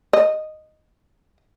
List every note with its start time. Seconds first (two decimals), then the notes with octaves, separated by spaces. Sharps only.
0.13 D#5